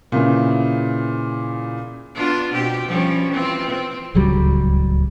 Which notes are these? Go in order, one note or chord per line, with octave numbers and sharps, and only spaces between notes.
A#2 C#3 E3
B3 D4 F4
B2 C4 G4
F3 G3 C#4
E3 C4 F4
C4
D1 C#2 F#3 G3